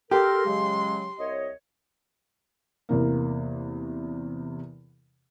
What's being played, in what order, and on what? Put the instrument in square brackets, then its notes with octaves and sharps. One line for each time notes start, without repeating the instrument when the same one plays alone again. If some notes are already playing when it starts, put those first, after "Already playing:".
[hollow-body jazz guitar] G4 [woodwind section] A4 A#4 [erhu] C6
[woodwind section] C#3 F#3 G#3
C2 C#5 D#5
[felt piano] E2 C3 A#3